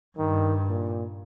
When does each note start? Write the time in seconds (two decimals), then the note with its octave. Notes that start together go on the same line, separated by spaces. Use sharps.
0.18 G2 D#3
0.68 A#2